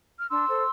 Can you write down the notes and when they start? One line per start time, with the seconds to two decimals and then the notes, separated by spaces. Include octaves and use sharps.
0.17 F6
0.30 D4 C6 E6
0.48 A4 C5